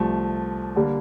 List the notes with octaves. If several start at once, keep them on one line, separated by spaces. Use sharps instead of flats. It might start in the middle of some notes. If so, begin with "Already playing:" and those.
Already playing: C2 C3 F3 A3
D3 G3 A#3